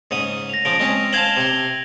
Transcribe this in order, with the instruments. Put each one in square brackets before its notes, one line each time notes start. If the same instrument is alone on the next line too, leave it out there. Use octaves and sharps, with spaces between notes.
[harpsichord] G#2 C#3 D#6
[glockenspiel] A#6 F7
[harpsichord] C#3 F3 [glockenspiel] D7
[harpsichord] G#3 C4 C#4
[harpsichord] C5 F5 A5 [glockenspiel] G#6 F7 F#7
[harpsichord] C3 C6